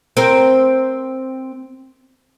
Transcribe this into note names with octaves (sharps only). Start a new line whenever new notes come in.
C4 A#4